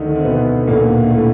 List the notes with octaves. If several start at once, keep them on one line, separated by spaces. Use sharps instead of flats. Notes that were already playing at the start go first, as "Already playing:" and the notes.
Already playing: D2 D3 D#3 D#4
C4
B2 B3
D2 A#2 D3 A#3
A2 A3